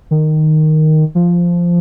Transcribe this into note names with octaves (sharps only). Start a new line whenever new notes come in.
D#3
F3